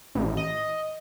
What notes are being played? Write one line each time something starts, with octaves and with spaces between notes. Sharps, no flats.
A1
D#5